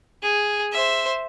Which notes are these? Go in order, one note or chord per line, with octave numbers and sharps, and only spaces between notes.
G#4
C5 E5